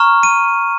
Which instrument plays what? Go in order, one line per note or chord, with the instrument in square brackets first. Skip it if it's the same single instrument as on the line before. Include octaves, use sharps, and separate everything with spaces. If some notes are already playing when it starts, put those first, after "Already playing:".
Already playing: [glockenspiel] A#5 C#6 F6
D#7